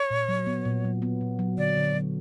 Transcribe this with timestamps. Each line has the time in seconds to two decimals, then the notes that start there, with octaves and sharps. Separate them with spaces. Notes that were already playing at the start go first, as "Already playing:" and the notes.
Already playing: C#5
0.11 A#2
0.29 F#3
0.47 B3
0.65 A#2
0.84 F#3
1.02 B3
1.21 A#2
1.39 F#3
1.58 D3 D5
1.77 D3
1.95 F#3